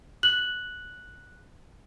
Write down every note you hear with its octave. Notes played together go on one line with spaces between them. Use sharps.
F#6 F#7